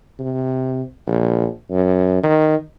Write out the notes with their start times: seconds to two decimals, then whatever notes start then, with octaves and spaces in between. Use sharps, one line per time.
0.19 C3
1.07 A#1
1.70 F#2
2.23 D#3